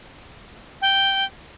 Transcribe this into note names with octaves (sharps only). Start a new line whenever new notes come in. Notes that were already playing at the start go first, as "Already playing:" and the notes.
G5